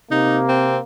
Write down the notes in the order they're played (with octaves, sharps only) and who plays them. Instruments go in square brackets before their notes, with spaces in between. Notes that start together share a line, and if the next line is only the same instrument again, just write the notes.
[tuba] C3 [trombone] A#3 [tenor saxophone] D#4
[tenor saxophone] C4